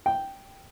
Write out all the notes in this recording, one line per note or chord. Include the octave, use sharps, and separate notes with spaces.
G5